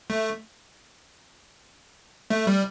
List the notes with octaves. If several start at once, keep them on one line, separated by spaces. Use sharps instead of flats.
A3
A3
G3